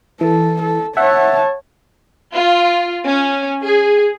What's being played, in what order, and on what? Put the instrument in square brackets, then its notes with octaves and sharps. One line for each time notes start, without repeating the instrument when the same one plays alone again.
[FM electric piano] E3 [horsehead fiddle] A4
[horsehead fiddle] A4
[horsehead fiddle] C#5 A5 [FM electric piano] E5 F#5
[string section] F4
C#4
G#4